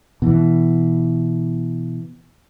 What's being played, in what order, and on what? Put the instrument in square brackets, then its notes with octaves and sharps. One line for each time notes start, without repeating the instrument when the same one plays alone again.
[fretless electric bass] B2 E3